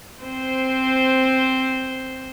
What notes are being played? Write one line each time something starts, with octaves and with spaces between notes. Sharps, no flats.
C4 C5